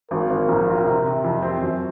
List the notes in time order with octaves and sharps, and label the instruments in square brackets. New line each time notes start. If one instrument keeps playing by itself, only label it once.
[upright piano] G#1 [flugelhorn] A#4
[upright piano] G#1
A#1
C4
C3
C3
F2
C4
F#2